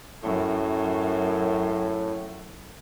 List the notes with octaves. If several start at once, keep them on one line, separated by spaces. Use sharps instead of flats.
F#2 A2